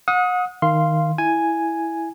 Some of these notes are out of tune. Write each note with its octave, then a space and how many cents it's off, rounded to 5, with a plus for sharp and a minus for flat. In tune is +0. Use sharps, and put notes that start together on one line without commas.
F#5 -35 D#6 +20
D#3 +0 F5 -15 C6 +0
E4 +0 G#5 +0